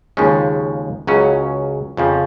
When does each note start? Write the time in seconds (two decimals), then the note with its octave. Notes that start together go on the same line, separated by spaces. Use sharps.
0.17 D#2 C#3 F3 G#3 C#4
1.07 C#2 C#3 F#3 C#4
1.97 F2 C#3 F3